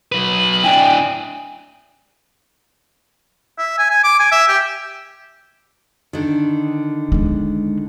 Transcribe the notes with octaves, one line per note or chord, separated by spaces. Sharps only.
F#3 B4 F#7
D4 E4 G5 G#5
E5
G#5
G#5
D6
G#5
E5
G4
D3 D#3
G#3 B3